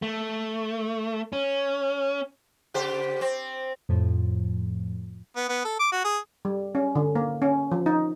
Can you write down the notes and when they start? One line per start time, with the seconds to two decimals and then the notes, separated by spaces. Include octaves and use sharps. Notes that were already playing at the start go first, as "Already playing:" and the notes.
0.02 A3
1.33 C#4
2.74 C#3 G4 C5
3.21 C4
3.89 F2 A2 F3
5.36 B3
5.49 B3
5.64 A4
5.79 D6
5.92 F#4
6.05 G#4
6.45 G3
6.75 C#4
6.95 D3
7.15 A#3
7.42 C#4
7.72 F3
7.86 D#4